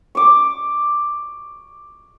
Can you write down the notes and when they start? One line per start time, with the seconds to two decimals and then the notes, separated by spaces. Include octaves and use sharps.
0.15 C#6 D6